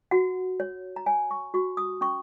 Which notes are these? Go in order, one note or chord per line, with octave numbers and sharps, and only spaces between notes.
F#4 F#5
C#5
A#5
C#5 G#5
C#6
F#4 C#6
D#6
C#4 C#6